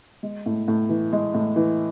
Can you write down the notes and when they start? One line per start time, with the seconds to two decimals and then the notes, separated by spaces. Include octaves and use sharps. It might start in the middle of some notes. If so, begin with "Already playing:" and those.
0.23 G#3
0.46 A2
0.68 A2
0.89 E3
1.13 G#3
1.34 A2
1.56 E3